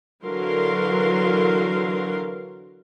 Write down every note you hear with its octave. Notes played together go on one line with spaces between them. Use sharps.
D3 E3 F#3 A#4 F5 C6